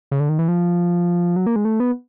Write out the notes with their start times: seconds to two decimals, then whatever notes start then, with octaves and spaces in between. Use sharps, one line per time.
0.11 C#3
0.20 D3
0.29 D#3
0.39 E3
0.48 F3
1.36 F#3
1.46 A#3
1.56 G#3
1.65 A3
1.80 B3